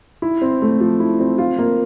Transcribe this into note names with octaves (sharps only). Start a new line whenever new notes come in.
E4
C4
A3
F3
E4
C4
F4
A#3